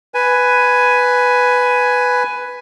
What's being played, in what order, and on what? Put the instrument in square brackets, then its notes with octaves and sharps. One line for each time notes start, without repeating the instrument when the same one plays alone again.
[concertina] B4 G#5